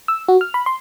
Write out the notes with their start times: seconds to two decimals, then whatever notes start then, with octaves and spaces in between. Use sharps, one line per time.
0.08 E6
0.28 F#4
0.41 F6
0.54 B5
0.66 C6